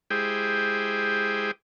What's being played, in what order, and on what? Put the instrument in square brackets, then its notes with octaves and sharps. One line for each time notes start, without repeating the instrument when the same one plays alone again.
[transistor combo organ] G#3 E4 G4 G#4 C5 G5